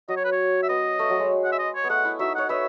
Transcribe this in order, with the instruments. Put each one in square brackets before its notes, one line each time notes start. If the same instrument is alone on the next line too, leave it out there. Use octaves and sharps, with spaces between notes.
[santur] F#3 [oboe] D#5
[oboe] C#5
B4
C#5
E5
[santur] B3 [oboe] D#5
[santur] A3
F#3
G#3
[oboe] F#5
E5
D#5
C#5
[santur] B3
[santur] A3 [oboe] F#5
[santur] E4
[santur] D#4 F#4 [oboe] E5
[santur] C#5 [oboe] F#5
[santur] B4 D#5 [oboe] E5